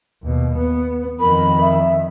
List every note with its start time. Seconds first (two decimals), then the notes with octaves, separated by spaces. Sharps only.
0.23 D#2 B2
0.57 B3
1.20 F2 D#3 A#4 B5
1.61 E5